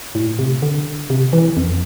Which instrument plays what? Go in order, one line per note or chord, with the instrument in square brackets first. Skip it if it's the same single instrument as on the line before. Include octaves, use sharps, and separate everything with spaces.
[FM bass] A2
C3
D3
C3
E3
F2